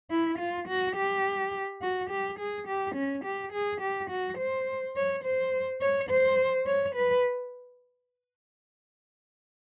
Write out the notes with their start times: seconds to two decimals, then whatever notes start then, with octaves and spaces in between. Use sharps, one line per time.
0.11 E4
0.39 F4
0.68 F#4
0.96 G4
1.82 F#4
2.10 G4
2.39 G#4
2.68 G4
2.95 C#4
3.25 G4
3.53 G#4
3.81 G4
4.10 F#4
4.38 C5
4.96 C#5
5.24 C5
5.81 C#5
6.10 C5
6.66 C#5
6.95 B4